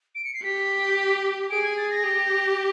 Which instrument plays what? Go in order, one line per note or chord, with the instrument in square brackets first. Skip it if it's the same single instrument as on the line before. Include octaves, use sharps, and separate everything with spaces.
[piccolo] D7
C#7
C7
[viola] G4 [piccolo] B6
[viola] G#4 [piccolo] D7
[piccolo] G#6
A6
A#6
[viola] G4